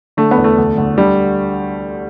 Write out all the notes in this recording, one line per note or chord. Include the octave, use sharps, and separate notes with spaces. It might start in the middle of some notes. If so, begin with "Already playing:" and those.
D3 A3
B3
E2
A3
D2
D2
D3 G3